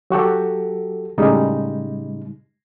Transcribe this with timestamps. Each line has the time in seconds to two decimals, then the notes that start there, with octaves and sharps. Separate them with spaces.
0.10 F#3 F#4 G4 A4
1.18 A2 C#3 G3 G#3 D#4